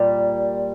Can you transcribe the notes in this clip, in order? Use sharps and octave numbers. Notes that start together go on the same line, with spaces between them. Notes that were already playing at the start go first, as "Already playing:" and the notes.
Already playing: A#2 G3